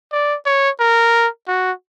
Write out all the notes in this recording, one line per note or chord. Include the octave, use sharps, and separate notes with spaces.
D5
C#5
A#4
F#4